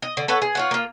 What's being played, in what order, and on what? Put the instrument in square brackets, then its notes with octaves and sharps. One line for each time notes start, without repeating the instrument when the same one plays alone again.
[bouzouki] D#5
D3
A4 B4 C#5 F#5
G#4
F4 C#5 F#5
A#3 F4